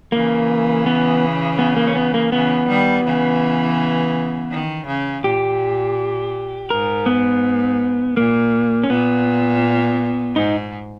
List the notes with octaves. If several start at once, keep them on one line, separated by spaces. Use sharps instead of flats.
C#3 E3 A#3
B3
B3
A#3
C#4
B3
A#3
C#3 E3 B3
D#3 G3
C#3 E3
D#3
C#3
A#2 G4
G#2 A#4
B3
A#2 A#3
C#4
A#2 B3
G#2 D#4